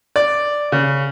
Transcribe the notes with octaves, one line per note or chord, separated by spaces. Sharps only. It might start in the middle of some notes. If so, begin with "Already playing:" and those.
D5
C#3